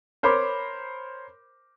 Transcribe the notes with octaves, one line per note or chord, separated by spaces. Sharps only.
A#4 C5 C#5 B5 D6